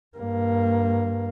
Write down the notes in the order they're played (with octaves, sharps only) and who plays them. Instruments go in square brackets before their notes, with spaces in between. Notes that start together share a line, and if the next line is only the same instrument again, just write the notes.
[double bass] G2 A#3